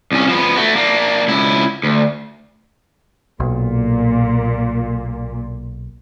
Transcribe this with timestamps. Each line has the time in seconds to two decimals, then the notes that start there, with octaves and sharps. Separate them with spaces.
0.12 C2 C#4
0.29 F3 B3
0.56 A3 F#4
0.76 A#3 D4
1.28 C#2 E4
1.83 D2
3.40 B1 A#2